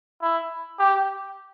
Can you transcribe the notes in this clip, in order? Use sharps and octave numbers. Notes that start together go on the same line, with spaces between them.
E4
G4